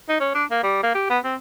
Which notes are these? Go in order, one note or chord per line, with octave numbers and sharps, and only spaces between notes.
D#4
C#4
D4
A#3
G3
A#3
G4
B3
C4